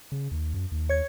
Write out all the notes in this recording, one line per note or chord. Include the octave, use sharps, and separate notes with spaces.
C#3
D#2
F#2
D#2
C#5 G#6